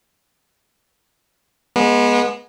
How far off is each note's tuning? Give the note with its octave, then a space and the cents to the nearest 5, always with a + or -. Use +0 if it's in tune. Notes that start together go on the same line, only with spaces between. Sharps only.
G#3 +0 B3 -30